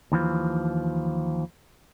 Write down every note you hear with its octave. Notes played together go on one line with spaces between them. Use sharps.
D#2 E3 F3